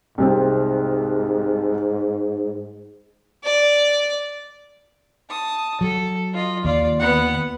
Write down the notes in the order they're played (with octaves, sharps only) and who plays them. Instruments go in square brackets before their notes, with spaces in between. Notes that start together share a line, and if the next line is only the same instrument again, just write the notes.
[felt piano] C2 C3 C4 [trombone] G#2
[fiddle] D5
[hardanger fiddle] A5 D#6
[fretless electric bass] F#3 [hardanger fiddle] A4
[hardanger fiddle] F4 D#5
[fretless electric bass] D#2 [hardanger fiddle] F4 D5
[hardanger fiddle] B3 F#5